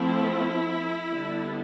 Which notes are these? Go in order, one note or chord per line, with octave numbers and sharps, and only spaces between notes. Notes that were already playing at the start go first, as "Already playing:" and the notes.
Already playing: F3 A3 C4 E4
D3 G3 B3 D4